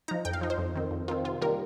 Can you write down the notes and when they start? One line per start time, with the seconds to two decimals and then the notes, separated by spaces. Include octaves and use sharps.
0.08 F3 D#4 A#5
0.25 F2 G5
0.33 F5
0.41 F3 D#4
0.50 C5
0.58 F2
0.75 D#3 C4
0.91 F2
1.08 D#3 C4 F4
1.24 C3 F4
1.42 D#3 G3 A#3 F4 A#4